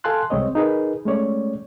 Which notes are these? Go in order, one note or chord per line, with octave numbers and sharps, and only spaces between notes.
A4 F5 G#5 A5 C6 F#6
C2 G#3 C4 C#5 D#5
D#4 G#4 A#4 B4
G#3 A3 C#4 C#5 D5